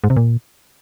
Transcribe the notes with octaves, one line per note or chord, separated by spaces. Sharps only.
G#2
C3
A#2